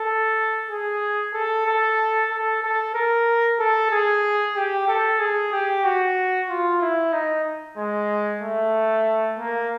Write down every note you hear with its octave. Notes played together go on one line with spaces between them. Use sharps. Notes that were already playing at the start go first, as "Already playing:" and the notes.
Already playing: A4
G#4
A4
A4
A4
A4
A#4
A4
G#4
G4
A4
G#4
G4
F#4
F4
E4
D#4
G#3
A3
A#3